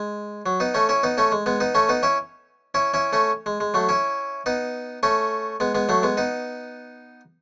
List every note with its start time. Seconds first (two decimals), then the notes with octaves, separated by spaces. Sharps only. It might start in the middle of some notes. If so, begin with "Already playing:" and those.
Already playing: G#3
0.46 F#3
0.60 B3 D#4
0.74 A3 C#4
0.89 C#4 E4
1.03 B3 D#4
1.18 A3 C#4
1.32 G#3
1.46 G#3 B3
1.60 B3 D#4
1.75 A3 C#4
1.89 B3 D#4
2.03 C#4 E4
2.75 C#4 E4
2.94 C#4 E4
3.13 A3 C#4
3.46 G#3
3.60 G#3
3.74 F#3 A3
3.89 C#4 E4
4.46 B3 D#4
5.03 A3 C#4
5.60 G#3 B3
5.75 G#3 B3
5.89 F#3 A3
6.03 G#3 B3
6.17 B3 D#4